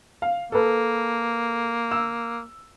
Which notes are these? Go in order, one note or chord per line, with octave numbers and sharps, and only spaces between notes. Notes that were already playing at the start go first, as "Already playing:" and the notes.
F5
A#3 A4 B4
E6 E7